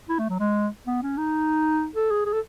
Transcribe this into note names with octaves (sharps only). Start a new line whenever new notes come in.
E4
A3
F#3
G#3
B3
C#4
D#4
A4
G#4
G#4
A4